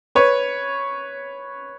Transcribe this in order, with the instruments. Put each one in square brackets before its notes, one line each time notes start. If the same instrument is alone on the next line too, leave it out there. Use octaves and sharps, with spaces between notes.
[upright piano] B4 C#5